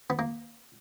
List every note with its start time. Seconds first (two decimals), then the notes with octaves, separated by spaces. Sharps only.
0.10 B3
0.19 A#3